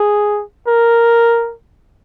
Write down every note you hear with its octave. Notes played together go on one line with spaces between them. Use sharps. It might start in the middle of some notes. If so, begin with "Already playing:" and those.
Already playing: G#4
A#4